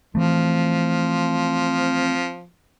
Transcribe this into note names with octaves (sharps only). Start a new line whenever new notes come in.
E3 F3 A3 C4